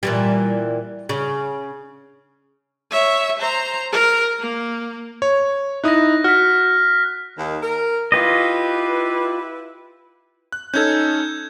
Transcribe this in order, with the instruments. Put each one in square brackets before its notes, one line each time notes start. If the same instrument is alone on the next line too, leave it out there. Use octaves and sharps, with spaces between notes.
[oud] A#2 E3 G3
C#3
[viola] C#5 E5
C5 A#5
A#4
A#3
[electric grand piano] C#5
[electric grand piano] D#4 E4 D#6 [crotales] F#6 A#6
[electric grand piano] F#4 [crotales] F6 B6
[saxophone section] D#2 D#3
A#4
[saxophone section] E4 B4 [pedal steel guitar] F4 G4 D#5
[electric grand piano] F#6
[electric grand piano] C#4 D#4 A4 [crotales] G6 G#6